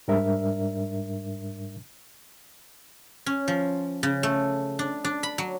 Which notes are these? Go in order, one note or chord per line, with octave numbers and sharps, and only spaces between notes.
G#2 G3 D4 A#4 E5
C#4
F3
C#3
A3
D4
D4
B5
F#3